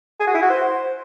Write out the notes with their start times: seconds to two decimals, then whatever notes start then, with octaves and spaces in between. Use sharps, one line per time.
0.20 G#4
0.27 F#4
0.35 E4
0.42 F#4
0.50 C5